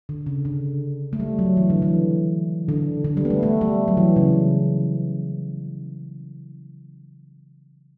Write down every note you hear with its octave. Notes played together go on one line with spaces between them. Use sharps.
D3
C#3
D3
A3
G3
F#3
E3
D3
E3
D3
D3
G3
B3
A3
A3
G3
F#3
E3
C#3